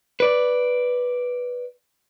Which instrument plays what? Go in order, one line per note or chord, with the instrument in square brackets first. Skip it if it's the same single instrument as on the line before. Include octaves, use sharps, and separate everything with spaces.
[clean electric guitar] B4 D5